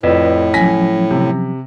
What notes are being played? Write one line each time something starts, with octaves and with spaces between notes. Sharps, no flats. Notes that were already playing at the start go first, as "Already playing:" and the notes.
F2 A2 B4 D5
F3 F#3 C#4 G#5 A#6 B6
C3